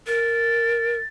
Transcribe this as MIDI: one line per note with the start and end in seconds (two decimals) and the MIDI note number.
0.07 0.97 70
0.07 1.06 93